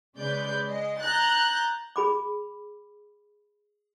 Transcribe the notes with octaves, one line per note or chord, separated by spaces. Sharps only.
C#3 G#3 B4 D5 G6
G#3 D#5
A#5 F#6 G6 A6
G#4 B5 D6